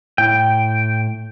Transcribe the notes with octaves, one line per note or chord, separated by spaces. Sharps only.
A2 G5